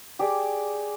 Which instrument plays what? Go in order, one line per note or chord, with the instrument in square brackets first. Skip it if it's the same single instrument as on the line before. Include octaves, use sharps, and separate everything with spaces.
[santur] G4 G#4 D5